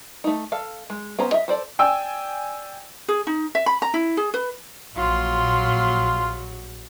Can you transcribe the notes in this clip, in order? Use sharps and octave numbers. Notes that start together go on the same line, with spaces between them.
A3 D#4
A4 F5
G#3
B3 C#4 C5 A#5
D#5 E5
A4 C5 D5
D5 G5 G#5 E6
G#4
D#4
E5
B5
A#5
E4
G#4
B4
A#1 F#3 F4 C6